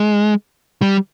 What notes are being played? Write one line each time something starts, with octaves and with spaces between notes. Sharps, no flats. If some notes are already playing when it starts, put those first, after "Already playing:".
Already playing: G#3
G3